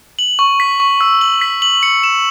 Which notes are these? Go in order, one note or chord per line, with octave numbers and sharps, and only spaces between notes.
F#7
C#6
B6
C#6
E6
F#7
B6
F#7
C#7
E7